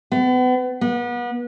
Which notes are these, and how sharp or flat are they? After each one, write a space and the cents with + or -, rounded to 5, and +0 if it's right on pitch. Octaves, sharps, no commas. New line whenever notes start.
B3 +35
B3 -35